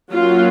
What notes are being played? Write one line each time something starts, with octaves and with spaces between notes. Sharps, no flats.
F#3 A#3 C#4 F4